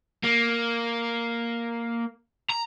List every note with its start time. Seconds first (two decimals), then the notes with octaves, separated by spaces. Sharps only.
0.24 A#3
2.50 A#5